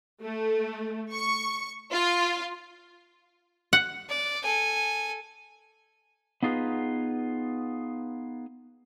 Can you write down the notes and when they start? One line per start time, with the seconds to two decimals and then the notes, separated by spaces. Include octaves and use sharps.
0.23 A3
1.12 C#6
1.92 F4
3.73 F#5
4.09 D5
4.43 A4 G#5
6.43 B3 D#4 F4 G#4 B4